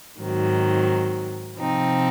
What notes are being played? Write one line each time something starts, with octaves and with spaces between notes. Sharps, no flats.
G#2 D#3 F#3 C4
C3 F3 C4 D#4